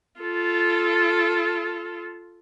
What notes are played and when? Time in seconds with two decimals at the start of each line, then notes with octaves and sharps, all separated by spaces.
0.20 F4 A4